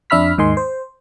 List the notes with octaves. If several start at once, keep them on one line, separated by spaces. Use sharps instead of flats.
F2 D4 E5 B5 F6 B6
D#2 G#2 D#3 D#5 G#5 C6
C5